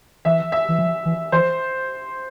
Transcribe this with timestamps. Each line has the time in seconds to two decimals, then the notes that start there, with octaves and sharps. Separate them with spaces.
0.25 E3 E5
0.52 E5
0.69 E3
0.79 F3
1.06 E3
1.32 E3 C5